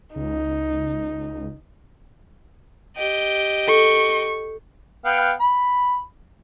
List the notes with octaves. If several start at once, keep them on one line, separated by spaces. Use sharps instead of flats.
C#2 D#4
G4 D#5
A4 C#6
B3 F5 G5
B5